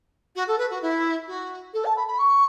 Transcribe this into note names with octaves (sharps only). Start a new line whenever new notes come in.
F#4
A4
B4
F#4
E4
F#4
A4
A5
B5
B5
C#6